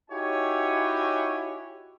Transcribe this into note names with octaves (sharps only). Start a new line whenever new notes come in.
D#4 E4 F#4 G4 C#5 G#5